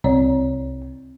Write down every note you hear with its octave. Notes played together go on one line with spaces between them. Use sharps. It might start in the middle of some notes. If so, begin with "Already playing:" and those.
C2 C4 C#5 D5